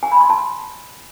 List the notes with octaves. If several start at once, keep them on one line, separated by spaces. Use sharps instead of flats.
G#5
B5
C6
A5